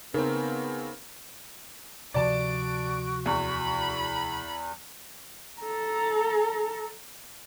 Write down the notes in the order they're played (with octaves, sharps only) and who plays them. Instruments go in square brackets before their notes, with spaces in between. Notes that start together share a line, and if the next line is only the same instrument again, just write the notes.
[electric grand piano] C#3 C4 [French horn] B3 [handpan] D#4 A#4
[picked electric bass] D2 C3 F3 [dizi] F#4 [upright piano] D5 A5 [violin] D7
[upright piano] E2 [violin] B5
[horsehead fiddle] A4 A#5